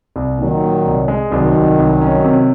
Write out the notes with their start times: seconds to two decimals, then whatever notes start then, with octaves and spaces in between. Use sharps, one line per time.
0.16 C2
0.38 A#2 D#3 F#3
0.63 A#2
0.86 C2
1.08 G#3
1.31 C2 D#3 F#3
1.55 C2
1.78 C2
2.02 C#4
2.25 C3